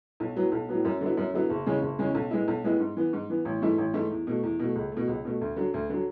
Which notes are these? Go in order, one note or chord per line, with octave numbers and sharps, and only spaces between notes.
B1
A2 F#3 B3
B1
A2 F#3 B3
F#2
D3 F#3 B3 E4
F#2
D3 F#3 B3 E4
F#1
E2 C#3 G#3 C#4
F#1
E2 C#3 G#3 C#4
B1
A2 G#3 B3 E4
B1
A2 G#3 B3 E4
G#2
E3 B3
G#2
E3 B3
A1
G#2 E3 A3 E4
A1
G#2 E3 A3 E4
E2
B2 A3
E2
B2 A3
C#2
B2 A3
C#2
B2 A3
D2
D3 F#3
D2
D3 F#3